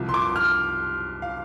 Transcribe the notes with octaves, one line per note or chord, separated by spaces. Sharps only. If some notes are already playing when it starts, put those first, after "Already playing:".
Already playing: C2 C3 F3
C6
D6
F6
F5